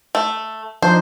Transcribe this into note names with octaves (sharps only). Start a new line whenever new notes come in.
A3
F3 D4 D#4 C5